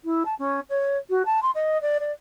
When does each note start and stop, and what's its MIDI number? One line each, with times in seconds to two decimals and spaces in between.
0.04 0.23 64
0.25 0.34 81
0.39 0.60 61
0.69 0.97 73
1.10 1.25 66
1.25 1.42 81
1.42 1.51 84
1.55 1.80 75
1.82 1.98 74
2.00 2.12 74